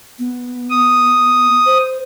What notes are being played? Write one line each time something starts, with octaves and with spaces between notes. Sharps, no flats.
B3
D#6
C5